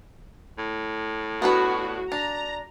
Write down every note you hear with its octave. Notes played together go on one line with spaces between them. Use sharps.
A2
B3 D4 F#4 B4
D4 A#5